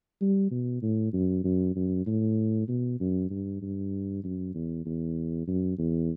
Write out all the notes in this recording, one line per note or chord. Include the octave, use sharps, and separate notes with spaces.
G3
B2
A2
F#2
F#2
F#2
A2
B2
F#2
G2
G2
F#2
E2
E2
F#2
E2